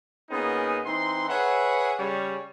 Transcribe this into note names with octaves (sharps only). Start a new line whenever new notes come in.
A#2 B3 C#4 D#4 G#4 A#4
E3 C4 D#4 C6
G#4 B4 C#5 E5 F#5
C#3 G3 C#5